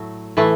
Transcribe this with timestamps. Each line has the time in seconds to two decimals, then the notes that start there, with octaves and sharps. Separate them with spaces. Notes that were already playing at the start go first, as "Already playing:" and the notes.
Already playing: A2 F#3 A3
0.37 A2 E3 A3